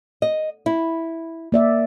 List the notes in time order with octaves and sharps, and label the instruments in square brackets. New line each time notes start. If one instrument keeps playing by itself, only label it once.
[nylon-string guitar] D#5
E4
[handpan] A#3 D5 E5